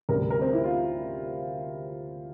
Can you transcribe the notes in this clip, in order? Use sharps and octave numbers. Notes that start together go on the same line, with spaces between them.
D2 C3 G3 A#4
A#4
C4
E4
F4